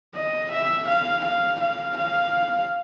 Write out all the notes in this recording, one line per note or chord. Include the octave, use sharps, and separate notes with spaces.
D#5
E5
F5
F5
F5
F5